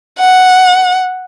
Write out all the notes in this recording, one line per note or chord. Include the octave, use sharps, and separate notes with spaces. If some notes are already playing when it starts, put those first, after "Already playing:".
F#5